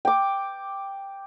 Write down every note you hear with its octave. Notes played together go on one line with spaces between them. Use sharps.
G5 D6